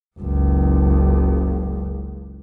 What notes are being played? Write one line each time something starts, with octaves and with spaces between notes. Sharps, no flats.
F#1 C#2